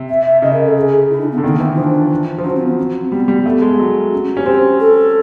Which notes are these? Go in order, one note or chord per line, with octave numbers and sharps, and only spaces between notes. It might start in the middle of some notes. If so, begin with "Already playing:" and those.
Already playing: C3
E5
E5
C#3 D#5
A#4
A4
G#4
E4
D4
B3
D3
D#3 B3
A#3
E3 B3
F3 D4
F3
F#3 C#4
C4
B3
C4
G3 B3
G3
A3
G#3
F#3
C#4
C#4 G4
C4
A4